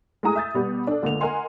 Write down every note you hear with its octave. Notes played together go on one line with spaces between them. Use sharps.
G#3 A3 E4 G#5 A#5 D#6
E5 G6 A6
B2 G3 B3 G4
D4 A4
C#2 D3 A3 A#3 F7
A#4 D#5 F#5 G#5 C6